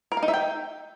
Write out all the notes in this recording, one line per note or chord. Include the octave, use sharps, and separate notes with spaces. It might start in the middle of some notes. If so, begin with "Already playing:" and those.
A#4
F5
D#4
E5
G5